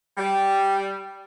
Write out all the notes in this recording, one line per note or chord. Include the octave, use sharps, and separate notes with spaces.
G3